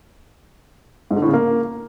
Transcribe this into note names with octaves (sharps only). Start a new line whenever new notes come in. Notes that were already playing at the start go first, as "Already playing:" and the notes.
G#2
D3
A2
C#3
A#3